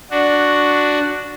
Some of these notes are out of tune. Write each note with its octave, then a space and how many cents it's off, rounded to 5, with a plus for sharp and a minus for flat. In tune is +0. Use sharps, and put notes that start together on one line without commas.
D4 +0 F#4 +0